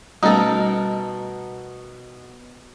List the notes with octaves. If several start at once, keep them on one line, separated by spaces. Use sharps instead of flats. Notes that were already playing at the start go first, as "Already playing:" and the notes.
B2 G3 A3 C#4 D#4 A4 A#4